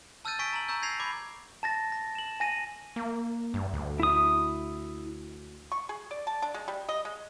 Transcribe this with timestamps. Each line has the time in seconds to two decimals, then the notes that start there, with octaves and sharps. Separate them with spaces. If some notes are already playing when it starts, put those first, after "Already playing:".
0.25 A5 E6 F6 G6 A6 D#7
0.39 G#5 C#6 B6 D7
0.53 A#5 F#7
0.68 A#5 C#6 E6 G6
0.82 G#6 A#6 C7 F7
1.00 B5 D6 G#6
1.63 A5 A6 A#6
1.92 A#6
2.15 E7 F#7
2.40 G#5 A#6 D#7
2.96 A#3
3.54 G2
3.73 D2
4.00 E4 D#6
5.72 C#6
5.89 G#4
6.11 D5
6.27 A5
6.42 D4
6.54 G#3
6.68 G3
6.89 D#5
7.05 G#3